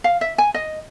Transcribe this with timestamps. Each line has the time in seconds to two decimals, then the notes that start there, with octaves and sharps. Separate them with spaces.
0.04 F5
0.21 E5
0.38 G#5
0.54 D#5